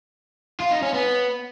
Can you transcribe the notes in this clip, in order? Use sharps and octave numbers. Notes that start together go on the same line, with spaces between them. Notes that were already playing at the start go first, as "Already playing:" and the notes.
F4
D#4
C#4
B3